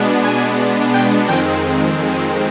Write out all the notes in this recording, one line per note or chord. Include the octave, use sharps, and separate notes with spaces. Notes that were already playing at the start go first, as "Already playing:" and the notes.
Already playing: B2 G#3 B3 D4
G#5
G5
F2 D#3 G#3 C4 G5